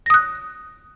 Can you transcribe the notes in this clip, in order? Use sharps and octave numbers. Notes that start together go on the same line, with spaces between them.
D#6 F#6 A#6